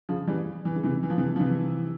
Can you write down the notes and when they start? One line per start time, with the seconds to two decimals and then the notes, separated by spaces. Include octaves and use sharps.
0.09 C#3 F3
0.27 E3 G3
0.65 E3
0.75 C#3
0.83 C3 E3
1.03 E3
1.10 F3
1.18 C3 E3
1.36 F3
1.40 C3 E3